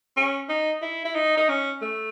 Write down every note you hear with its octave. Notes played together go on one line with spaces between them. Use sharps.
C#4
D#4
E4
E4
D#4
D#4
C#4
A3